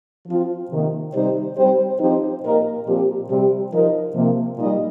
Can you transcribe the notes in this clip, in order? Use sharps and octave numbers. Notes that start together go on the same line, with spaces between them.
F3 C4 F4
C3 D#3 A#3
C3 G3 D#4 G4 C5
G3 C4 G4 C5
F3 C4 D#4 G4 C5
A#2 A#3 G4 A#4 D#5
A#2 F3 C4 G4
C3 G3 C4 G4
F3 D#4 A#4
C3 F3 A#3
A#2 G3 D#4 A#4 D#5